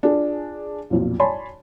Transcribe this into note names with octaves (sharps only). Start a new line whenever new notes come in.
D4 F4 G#4
B1 F2 A#2
C#5 D5 G#5 A5 B5 C6